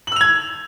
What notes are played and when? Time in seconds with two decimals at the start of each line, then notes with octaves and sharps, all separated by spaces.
0.07 F#7
0.12 E6
0.16 F7
0.21 G#6